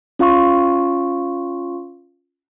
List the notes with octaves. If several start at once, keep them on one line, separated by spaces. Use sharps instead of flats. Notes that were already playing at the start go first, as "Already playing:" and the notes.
C#4 F4 F5 C6 C#6